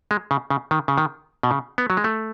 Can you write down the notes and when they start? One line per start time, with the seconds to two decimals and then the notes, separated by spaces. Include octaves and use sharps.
0.11 G#3
0.31 C#3
0.50 C#3
0.71 D#3
0.88 C#3
0.98 D#3
1.43 B2
1.51 C#3
1.78 B3
1.90 F#3
1.97 G#3
2.04 A3